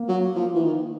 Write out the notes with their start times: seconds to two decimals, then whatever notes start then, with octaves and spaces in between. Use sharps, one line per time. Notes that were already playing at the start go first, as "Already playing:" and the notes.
Already playing: A#3
0.09 F#3
0.36 F3
0.54 E3
0.64 D#3